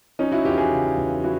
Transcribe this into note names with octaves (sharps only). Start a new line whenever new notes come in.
F3 C#4 D#4
E4 F#4
E2 F4 G4
F#4 G#4
C#3
E2
F3 E4 F#4